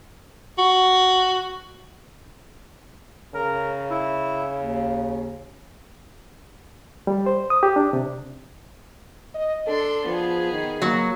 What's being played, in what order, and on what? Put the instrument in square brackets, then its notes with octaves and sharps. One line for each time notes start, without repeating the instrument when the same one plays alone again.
[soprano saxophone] F#4
[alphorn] C#3 [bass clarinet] A#4
[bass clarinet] E4
D#2
[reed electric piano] G3
C5
D#6
G4
D4
C3
[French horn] D#5
[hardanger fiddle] D4 C6 [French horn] A4
[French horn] F3 [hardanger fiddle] B3 G#4
[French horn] D#3
[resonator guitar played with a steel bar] F#3 [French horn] A#3